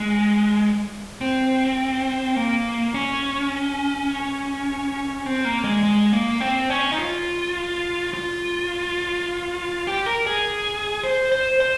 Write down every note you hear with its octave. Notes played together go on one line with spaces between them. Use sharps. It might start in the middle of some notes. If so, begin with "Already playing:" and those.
Already playing: G#3
C4
A#3
C#4
C4
A#3
G#3
G#3
A#3
C4
C#4
D#4
F4
F4
G4
A#4
G#4
C5
C5
C5